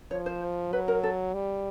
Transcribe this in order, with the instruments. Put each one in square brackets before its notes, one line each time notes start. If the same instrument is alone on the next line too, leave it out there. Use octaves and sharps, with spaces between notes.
[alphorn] F3 [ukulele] C#5
[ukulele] C5
[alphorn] F#3 [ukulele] B4
[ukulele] A#4
A4
[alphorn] G3